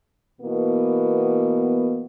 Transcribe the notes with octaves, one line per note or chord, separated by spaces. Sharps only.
B2 E3 A#3 B3